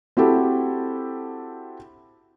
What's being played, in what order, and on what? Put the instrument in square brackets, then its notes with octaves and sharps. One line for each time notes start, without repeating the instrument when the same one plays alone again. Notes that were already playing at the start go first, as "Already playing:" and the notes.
[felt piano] C4 E4 F#4 G4 A4